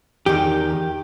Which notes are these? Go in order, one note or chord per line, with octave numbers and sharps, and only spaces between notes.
E2 D#3 G4